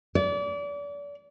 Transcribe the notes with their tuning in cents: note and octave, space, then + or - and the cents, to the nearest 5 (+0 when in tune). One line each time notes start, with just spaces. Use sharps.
D5 -35